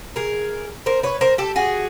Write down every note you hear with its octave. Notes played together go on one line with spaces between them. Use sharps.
G#4 A#4
A#4 C5
B4 C#5
A#4 C5
G4 A4
F#4 G#4